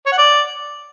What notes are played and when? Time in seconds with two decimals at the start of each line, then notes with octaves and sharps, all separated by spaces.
0.06 C#5
0.12 F#5
0.18 D5